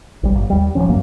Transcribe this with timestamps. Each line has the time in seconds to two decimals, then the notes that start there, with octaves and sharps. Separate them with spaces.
0.23 B1 G3
0.35 G1
0.50 D#2 G3
0.75 D1 E2 F3 C#4
0.89 D2 G2 F#3 A#3